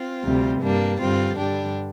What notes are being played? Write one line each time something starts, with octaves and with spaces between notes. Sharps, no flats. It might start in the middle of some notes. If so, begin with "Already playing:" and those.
Already playing: C4 F4
D2 C3 G3
G2 G3 A#3 D4
G2 D3 G3 C4 F4
G2 D3 G3 D4 G4